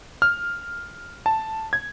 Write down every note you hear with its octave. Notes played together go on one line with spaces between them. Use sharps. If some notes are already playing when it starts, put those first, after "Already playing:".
F6
A5
G#6